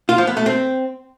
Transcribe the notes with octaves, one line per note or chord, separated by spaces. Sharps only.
F4
F3
B3
A3
C4